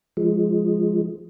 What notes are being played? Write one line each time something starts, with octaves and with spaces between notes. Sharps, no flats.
F3 G#3